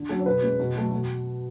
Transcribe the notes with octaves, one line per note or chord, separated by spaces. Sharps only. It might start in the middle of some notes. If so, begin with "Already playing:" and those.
Already playing: D3
F#3 C#4 A4
C#5
B2 B4
G#3 C#4
B2
F#3 A3
B2